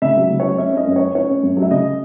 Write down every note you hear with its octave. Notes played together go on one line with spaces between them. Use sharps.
C#3 E5
F#3
C#3
F#3 C#5
C#4 E5
C#4 D#5
F#2
C#4 C#5
C#4 C#5
C#4
F#2
F#3
E5
C#3 D#5